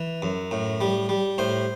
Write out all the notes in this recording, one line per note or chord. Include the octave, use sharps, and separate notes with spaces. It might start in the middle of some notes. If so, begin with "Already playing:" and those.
Already playing: E3
F#2
A2
G3
G3
A2 C5